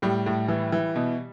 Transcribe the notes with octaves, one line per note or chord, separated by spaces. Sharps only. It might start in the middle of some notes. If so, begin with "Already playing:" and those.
A2 G3
A2
E3
E3
B2